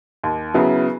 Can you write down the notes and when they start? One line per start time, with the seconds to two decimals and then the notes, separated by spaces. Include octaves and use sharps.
0.24 D#2
0.54 C#3 F#3 B3 E4